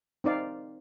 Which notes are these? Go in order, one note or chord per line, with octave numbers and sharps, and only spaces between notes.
C4 D#4 D5 F5